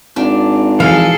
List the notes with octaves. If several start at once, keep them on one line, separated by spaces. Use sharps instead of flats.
G#1 D4
E3 F3 G#4 A4 F5